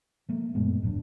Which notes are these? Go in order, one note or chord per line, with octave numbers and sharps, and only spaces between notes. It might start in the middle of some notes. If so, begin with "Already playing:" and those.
F3 A3 A#3
F#2 A#2 G#3 B3
D#1 A2 F#3 D4